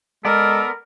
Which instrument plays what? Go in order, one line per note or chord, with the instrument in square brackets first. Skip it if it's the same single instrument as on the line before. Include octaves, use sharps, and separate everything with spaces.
[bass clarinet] G#3 [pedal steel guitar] B3 D5 [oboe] A4 [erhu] A#4